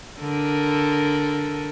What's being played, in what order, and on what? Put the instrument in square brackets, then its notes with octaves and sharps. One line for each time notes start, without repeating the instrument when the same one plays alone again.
[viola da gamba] D3 A4 A#4